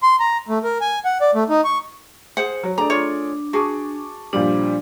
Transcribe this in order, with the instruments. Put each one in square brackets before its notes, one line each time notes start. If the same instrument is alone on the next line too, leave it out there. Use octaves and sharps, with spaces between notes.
[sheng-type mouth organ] C6
A#5
A3
A#4
G#5
F#5
D5
A3
D#4
C#6
[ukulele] G#4 C5 F#5
[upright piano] F#3
[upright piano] A3 G#4 D5 [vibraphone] D4 [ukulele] A#5
[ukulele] F4 C#5
[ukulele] F#4 G#4 [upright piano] A5 C#6 D6
[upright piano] A#2 F3 G3 [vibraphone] D4